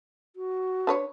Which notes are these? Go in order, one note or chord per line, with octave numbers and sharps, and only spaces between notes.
F#4
D4 B4 C#5